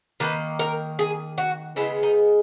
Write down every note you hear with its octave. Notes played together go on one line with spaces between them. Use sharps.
D#3 A#3 B4
A#4
G#4
F#4
C#3 G#3 B3 E4
D#4